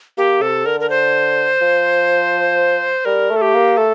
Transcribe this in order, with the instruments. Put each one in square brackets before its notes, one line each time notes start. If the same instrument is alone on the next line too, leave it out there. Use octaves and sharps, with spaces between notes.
[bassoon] A#3 [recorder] G4
[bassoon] C3 [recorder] A4
[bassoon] D3 [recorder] A#4
[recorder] A#4
C5
[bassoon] F3
[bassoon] G3 [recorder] A#4
[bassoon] A3
[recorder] A4
G4
[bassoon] A#3
[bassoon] A3 [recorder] A4